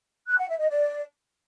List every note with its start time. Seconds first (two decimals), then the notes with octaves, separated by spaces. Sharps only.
0.28 F#6
0.39 F#5
0.49 E5
0.59 D#5
0.70 D5